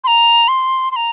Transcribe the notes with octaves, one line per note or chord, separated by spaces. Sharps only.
C6
A#5
C6
C6
A#5